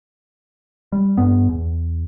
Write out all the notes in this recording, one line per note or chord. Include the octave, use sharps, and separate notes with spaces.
G3
G2 B3
E2